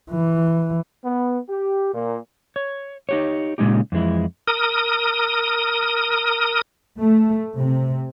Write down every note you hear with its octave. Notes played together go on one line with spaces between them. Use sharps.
E3
B3
G4
A#2
C#5
D#4 G4 C#5
A#2 C#3 G#3 C#4 D#4 G4
F2 E3 G#3 E4
A#4 D#6
A3
C3